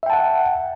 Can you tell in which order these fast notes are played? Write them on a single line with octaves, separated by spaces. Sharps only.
E5 G5 A5 F#5